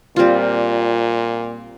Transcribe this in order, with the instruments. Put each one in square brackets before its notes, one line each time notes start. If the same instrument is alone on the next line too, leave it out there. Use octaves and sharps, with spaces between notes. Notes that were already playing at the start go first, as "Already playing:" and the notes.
[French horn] A#2 [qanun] G3 C4 F4